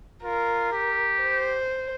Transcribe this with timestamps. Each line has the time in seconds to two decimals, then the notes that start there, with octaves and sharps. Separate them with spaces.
0.23 F4 A#4
0.72 G4
1.22 C5